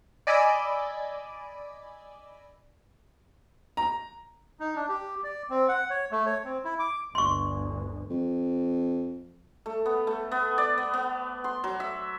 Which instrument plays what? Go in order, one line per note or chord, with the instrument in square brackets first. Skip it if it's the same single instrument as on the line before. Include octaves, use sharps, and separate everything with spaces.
[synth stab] D5 D#5 G#5 B5 D6 E6
[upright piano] A#5
[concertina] D#4
D4
G4
D5
C4
F#5
C#5
A3
C#5
C4
E4
D6
[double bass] G1 D2 [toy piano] C6 C#6
[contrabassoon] F2
[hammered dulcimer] A3
B3
A3
B3
D5
B3
B3
C6
F#3
E5